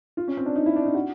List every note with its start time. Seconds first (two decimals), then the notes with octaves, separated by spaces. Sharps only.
0.17 F4
0.28 C#4
0.37 C4
0.46 D4
0.56 D#4
0.66 E4
0.76 D4
0.86 D#4
0.94 F#4